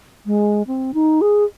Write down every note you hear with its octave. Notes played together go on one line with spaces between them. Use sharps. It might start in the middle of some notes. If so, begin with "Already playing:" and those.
G#3
C4
D#4
G#4